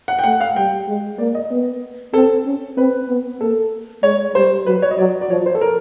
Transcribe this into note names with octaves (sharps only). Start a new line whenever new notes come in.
F#5
G5
A3 F#5
F5
G3 G5
G#3
A#3 D5
D#5
B3
C4 A4
C#4
C4 B4
B3
A#3 A4
G#3 C#5
G3 C5
F#3 B4
C#5
D#5
F#3 D5
D5
F3 C#5
C5
A4
A#4